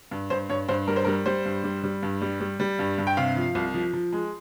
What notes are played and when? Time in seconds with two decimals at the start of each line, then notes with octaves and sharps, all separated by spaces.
0.11 G2
0.30 G2 C5
0.49 G2 C#5
0.69 G2 C5
0.87 G3 A#4
0.96 C5
1.05 G3 A#4
1.26 G3 C5
1.45 G2
1.64 G3
1.84 G3
2.03 G2
2.22 G3
2.41 G3
2.60 G3
2.79 G2
2.98 G2
3.07 G5
3.17 C3 F5
3.36 F3
3.55 C2
3.74 F3
3.94 F3
4.13 G#3